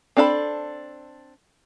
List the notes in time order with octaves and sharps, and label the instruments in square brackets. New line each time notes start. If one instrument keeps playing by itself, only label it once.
[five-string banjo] C4 D4 A4 F5 B5